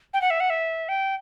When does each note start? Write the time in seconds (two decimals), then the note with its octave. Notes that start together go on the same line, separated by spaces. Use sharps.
0.14 G5
0.22 F#5
0.30 E5
0.40 F#5
0.50 E5
0.89 G5